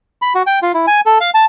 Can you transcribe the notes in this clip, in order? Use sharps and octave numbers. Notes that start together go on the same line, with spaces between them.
B5
F#4
G5
F4
E4
G#5
A4
F5
A5